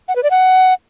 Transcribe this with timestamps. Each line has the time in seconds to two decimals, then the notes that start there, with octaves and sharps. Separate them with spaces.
0.08 F#5
0.16 B4
0.23 D5
0.31 F#5